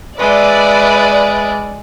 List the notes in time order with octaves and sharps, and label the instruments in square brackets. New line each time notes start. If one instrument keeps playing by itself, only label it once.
[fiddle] G#3 [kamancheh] B4 E5 [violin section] D5